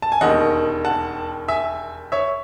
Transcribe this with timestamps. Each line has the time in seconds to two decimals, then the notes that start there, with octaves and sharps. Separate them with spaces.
0.02 A5
0.12 G#5
0.21 E1 D#2 D#3 D#5 F#5
0.85 F#5 A5
1.48 E5 G#5
2.12 C#5 E5